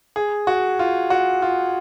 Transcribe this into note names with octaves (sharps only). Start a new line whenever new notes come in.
G#4
F#4
F4
F#4
F4